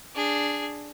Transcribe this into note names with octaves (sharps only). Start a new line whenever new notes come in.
D4 G#4